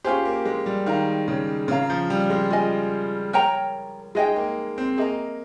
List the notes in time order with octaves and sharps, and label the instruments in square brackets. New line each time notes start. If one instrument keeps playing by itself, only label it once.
[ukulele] C#4 F4 G#4 C5 [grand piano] G4
[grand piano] A#3
G#3
G3
[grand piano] D#3 [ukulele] A#4 F5 A#5
[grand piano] C#3
[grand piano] C#3 [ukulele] F4 A#4 F5 A#5
[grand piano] F3
G3
G#3
[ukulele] F4 G#4 D#5 G#5
A#4 C#5 G5 A#5
[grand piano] G#3 [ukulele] D#4 G#4 D#5 G5
[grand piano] A#3
C4
[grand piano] A#3 [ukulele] G#4 D#5 A#5